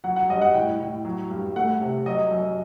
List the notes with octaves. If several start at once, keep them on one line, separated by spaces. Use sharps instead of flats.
F#3 F#5
F#5
G2 D#5
F#5
A2 G5
A2
F#3
G2
A3 F#5
C3
F#3 D#5
F#2